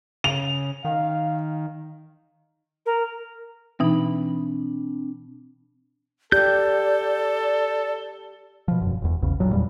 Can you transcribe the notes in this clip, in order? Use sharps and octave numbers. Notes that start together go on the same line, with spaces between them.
C#3 F7
D#3 F5
A#4
B2 E3 C4 D4 D#4 B5
G4 A4 D5 G6
B2 F3
E1 F#2
E1 E2
A#1 E2 C#3
A1 G2 A#2 F#3
E2 G2 A#2 G3